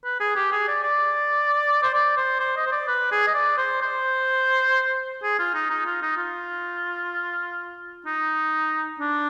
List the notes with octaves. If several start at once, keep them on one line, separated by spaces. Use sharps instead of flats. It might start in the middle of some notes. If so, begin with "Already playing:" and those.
B4
G#4
G4
G#4
D5
D5
C5
D5
C5
C5
D#5
C5
D5
B4
G#4
D#5
D5
C5
C5
G#4
F4
D#4
D#4
F4
D#4
F4
D#4
D4